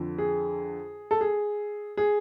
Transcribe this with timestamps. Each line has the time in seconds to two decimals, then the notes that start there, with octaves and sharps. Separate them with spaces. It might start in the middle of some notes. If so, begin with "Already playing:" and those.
Already playing: F2 D3
0.18 G#4
1.11 A4
1.21 G#4
1.97 G#4